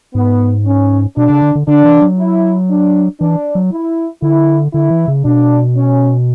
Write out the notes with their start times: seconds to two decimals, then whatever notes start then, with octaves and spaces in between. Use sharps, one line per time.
0.15 G#2 B3
0.66 C#4
1.16 B2 D4
1.30 C#3
1.42 D3
1.55 D3
1.67 D3 D4
1.85 E3
2.02 F#3
2.19 E4
2.70 D4
3.21 E3 D4
3.55 F#3
3.72 E4
4.22 D3 E4
4.74 D3 E4
4.90 E3
5.08 C#3
5.25 B2 D4
5.76 C#4